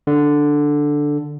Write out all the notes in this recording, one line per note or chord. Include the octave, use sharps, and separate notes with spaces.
D3